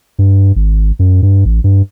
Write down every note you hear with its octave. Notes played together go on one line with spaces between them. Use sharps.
G2
G#1
F#2
G2
A1
G2